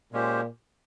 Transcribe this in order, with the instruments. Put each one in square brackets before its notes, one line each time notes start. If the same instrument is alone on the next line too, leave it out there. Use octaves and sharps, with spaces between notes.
[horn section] A#2 [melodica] G#3 C#4 G4 C5